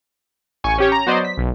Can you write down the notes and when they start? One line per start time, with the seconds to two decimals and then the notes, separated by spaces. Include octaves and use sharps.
0.64 A1 G#5 C#6
0.78 C#4 G4 C#5
0.92 A#5
1.07 F#3 B3 C5 D5 D#5
1.25 B6
1.38 B1